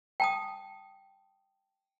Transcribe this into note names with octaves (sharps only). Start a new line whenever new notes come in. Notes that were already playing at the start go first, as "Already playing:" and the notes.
G5 A5 D#6